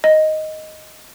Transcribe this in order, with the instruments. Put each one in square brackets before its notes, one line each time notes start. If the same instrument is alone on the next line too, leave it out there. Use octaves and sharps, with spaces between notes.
[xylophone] D#5